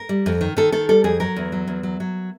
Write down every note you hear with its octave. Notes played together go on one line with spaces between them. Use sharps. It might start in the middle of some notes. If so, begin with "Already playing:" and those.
Already playing: A#4
G3
F2
D#3
D#3 A4
D#3 A4
G3 A4
F2 G#4
F#3 A#4
E2
F#3
E2
F#3
F#3